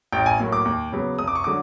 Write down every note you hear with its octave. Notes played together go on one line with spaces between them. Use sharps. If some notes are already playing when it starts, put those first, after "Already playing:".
A1 G5
G#5
A2 F#3 A#3
D6
D#2
C#3 F#3 B3
F1 D#6
D6
C#6
D3 F#3 D6